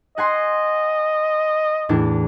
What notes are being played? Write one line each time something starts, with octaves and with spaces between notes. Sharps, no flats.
D#5 F#5 G#5 C6
E2 A2 D4